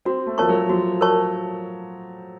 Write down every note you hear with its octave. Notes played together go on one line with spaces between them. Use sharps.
C4 F#4
A3
F3 A#4 C#5 A5 C#6
F#3
F3 F#4
A#4 C#5 A5 C#6